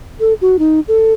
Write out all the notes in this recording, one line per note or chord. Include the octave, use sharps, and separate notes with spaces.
A4
F#4
D#4
A4